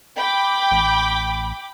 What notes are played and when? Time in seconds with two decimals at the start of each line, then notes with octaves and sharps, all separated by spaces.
0.17 G5 B5 D6
0.71 A1